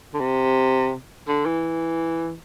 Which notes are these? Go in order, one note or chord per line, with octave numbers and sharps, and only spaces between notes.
D3
C3
D3
E3